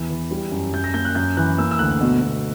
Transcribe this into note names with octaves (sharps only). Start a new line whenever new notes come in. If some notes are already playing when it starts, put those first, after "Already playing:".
Already playing: E2 E3
E3
G3
F#2
F#2 G6
A#6
A#3 G6
F#6
F#2 G6
E3 F#6
A#3 E6
E6
D2 F#6
B2
B2